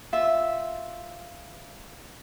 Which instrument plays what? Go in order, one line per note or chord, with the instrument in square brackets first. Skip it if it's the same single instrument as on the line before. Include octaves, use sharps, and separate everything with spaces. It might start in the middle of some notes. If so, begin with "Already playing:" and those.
[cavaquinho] F4 E5